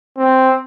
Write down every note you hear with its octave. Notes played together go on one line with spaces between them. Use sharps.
C4